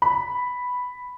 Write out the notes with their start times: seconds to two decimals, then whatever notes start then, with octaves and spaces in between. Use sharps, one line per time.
0.02 B5